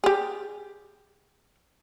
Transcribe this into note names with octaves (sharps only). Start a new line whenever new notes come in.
G4 G#4